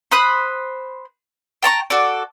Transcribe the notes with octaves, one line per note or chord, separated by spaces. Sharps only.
C5 B5 D#6 F#6
G5 A5 A#5 C#6
F#4 A4 D5